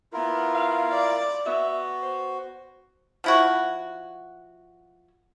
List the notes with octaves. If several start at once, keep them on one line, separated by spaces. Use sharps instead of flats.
B3 E4 F4 A#4
F5
D5
B3 F#4 E5
C5
F3 E4 F#4